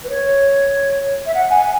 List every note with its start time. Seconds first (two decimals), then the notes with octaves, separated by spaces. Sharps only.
0.04 B4
0.09 C#5
1.26 E5
1.34 F#5
1.50 G#5